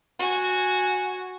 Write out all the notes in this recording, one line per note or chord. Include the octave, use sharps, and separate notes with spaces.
F#4 G#5